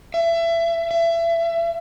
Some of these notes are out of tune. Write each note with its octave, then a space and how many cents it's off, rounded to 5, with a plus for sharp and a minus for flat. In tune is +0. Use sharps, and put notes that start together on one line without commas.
E5 +25
E5 +25